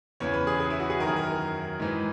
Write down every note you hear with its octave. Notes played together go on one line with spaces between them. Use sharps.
E2 C#3 E3 C#5
B4
G#4
G#4
E4
F#4
G#4
F#2 D#3 G#4 A#4
A#4
G#2 E3